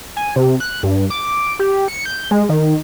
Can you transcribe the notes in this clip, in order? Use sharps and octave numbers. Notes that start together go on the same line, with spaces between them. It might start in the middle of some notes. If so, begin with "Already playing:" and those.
G#5
C3
F#6
G2
D6
G4
C#7
G6
G#3
D#3